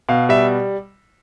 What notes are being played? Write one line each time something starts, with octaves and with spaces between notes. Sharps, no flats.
B2 F5
G3 E5